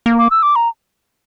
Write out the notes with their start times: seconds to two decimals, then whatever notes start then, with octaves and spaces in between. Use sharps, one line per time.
0.06 A#3
0.18 D6
0.31 E6
0.43 D6
0.56 A#5